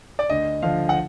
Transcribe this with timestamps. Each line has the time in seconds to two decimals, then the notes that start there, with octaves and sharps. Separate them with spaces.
0.19 D5
0.30 D2 D#5
0.62 D3 F3 F5
0.89 F#5